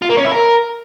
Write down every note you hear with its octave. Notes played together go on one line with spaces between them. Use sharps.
F4
A#3
C#4
E4
A#4